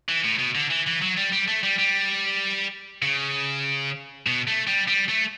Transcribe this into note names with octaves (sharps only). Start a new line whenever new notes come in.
E3
A2
B2
D3
E3
E3
F#3
G3
G3
A3
G3
G3
C#3
B2
A3
G3
G3
A3